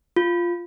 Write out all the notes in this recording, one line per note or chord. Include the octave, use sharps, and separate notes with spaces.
F4